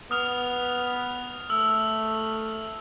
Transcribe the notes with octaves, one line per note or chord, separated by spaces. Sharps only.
B3 D#6 F6 F7
A3 E6